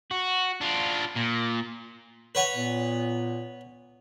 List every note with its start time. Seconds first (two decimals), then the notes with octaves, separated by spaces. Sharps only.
0.11 F#4
0.61 D4 F4
1.16 A#2
2.35 B4 C#5 F#5
2.55 A#2 B3